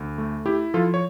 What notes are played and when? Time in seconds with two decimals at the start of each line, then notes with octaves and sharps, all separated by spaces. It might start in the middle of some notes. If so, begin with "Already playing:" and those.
Already playing: D2
0.18 A3
0.46 E4 G4
0.74 F3 F4 A4
0.94 C#5